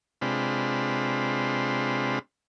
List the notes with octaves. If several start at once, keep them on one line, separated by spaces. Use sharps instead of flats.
C3 G#3 C4 D4 F4 B4